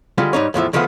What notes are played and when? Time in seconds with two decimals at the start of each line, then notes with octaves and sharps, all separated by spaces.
0.18 D3 G3 G#3 F4
0.33 G#2 G3 D#4 C#5
0.54 E2 A2 F3 E5
0.73 D#3 F3 G#3 A3 B3